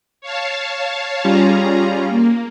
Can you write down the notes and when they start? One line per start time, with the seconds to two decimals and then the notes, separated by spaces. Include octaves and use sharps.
0.21 C#5 F5 A5
1.24 G3 C#4 F4 G#4 A#5
2.08 A#3